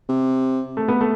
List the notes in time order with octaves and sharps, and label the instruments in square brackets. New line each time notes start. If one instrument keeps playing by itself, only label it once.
[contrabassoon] C3
[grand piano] A3
B3
A3